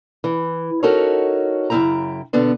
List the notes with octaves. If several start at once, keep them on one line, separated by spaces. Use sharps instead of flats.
E3
C#4 D#4 F#4 A4 A#4 C#5
F#2 C#3 C4 E4 G5 A#5
B2 D3 B3 D4